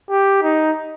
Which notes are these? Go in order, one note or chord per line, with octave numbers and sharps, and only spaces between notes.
G4
D#4